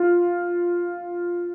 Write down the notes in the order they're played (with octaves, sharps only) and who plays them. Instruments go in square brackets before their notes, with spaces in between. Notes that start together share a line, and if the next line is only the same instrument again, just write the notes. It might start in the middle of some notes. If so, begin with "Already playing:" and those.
Already playing: [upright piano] F4